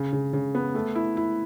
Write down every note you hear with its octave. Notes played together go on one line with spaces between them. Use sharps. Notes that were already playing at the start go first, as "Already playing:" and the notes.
Already playing: C#3
C#3
C#3
B3
A3
E4
E4